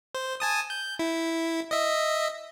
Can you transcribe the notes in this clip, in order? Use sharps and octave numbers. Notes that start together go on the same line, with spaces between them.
C5
G#5 A5 D#6
G6
E4
D#5 E5